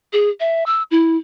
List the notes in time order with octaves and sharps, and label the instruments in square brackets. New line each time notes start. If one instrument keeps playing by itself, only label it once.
[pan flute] G#4
E5
E6
E4